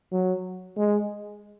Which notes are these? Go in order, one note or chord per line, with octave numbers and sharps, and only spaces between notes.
F#3
G#3